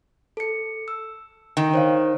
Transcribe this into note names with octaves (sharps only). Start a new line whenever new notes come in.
A4 C#7
E6
D#3 G5
C5 C#5 F5